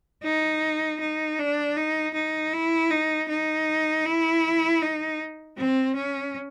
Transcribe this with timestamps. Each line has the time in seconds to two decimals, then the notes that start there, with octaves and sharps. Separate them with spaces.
0.23 D#4
1.00 D#4
1.39 D4
1.77 D#4
2.14 D#4
2.53 E4
2.90 D#4
3.28 D#4
4.06 E4
4.82 D#4
5.57 C4
5.96 C#4